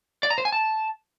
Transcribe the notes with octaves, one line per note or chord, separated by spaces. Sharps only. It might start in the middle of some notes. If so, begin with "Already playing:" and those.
D5
A#5
C5
G#5
A5